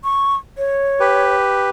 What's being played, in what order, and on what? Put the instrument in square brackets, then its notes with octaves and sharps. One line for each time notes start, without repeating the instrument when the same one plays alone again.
[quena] C#6
C#5
[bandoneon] G4 B4